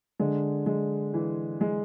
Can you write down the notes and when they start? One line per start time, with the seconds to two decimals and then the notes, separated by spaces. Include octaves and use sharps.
0.20 D3 G#3
0.66 G#3
1.14 E3
1.61 G#3